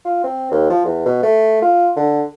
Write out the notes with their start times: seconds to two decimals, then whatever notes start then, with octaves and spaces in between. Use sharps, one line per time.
0.05 F4
0.24 C4
0.51 D#2
0.70 F3
0.85 E2
1.06 B2
1.23 A3
1.62 F4
1.96 D3